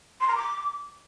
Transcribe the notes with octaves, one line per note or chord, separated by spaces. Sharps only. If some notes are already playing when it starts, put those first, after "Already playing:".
C6
A#5
D6